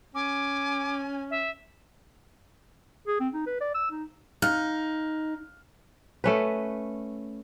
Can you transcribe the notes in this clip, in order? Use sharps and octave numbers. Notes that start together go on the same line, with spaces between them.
C#4 G#5 D6
E5
G#4
C4
D#4
B4
D5
E6
D#4
D#4 F5 F6 F#6
A3 C#4 B4